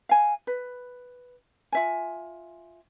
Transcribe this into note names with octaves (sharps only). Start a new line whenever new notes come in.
F5 G#5
B4
F4 E5 G#5